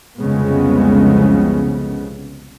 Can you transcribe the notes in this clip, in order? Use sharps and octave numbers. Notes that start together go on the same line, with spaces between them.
C2 F2 C#3 G#3 B3